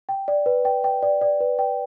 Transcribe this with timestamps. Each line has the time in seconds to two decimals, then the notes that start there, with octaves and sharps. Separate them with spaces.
0.09 G5
0.28 D5
0.46 B4
0.65 G5
0.84 G5
1.02 D5
1.21 D5
1.40 B4
1.59 G5